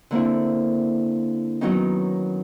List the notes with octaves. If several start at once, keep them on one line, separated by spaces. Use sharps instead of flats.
D3 A#3 C4 E4
D#3 F#3 B3 C#4 D#4